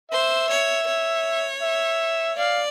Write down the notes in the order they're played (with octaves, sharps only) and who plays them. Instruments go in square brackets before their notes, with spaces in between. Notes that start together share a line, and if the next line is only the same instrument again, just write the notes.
[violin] C5 [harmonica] E5
[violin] C#5
C#5
[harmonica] E5
[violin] D5 [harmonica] F5